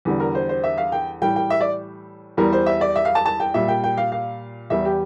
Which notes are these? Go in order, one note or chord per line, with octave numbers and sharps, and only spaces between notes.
E2 D3 G3
A#4
C5
C5
E5
F5
G5
A2 E3 G3 G5
G5
E5
D5
E2 E3 G3 A#4
C5
E5
D5
E5
F5
A5
A5
G5
A#2 G3 E5
G5
G5
F5
F5
E2 E3 G3 E5
G4